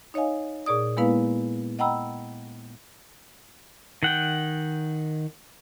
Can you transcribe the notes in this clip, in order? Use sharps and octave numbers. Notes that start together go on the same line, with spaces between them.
D#4 C#5 D#5 F5 G#5
A#2 G#4 D5 D#6
G#3 A#3 B3 E4 B4 F5
D#5 F#5 G5 A#5 B5 E6
D#3 F#5 G5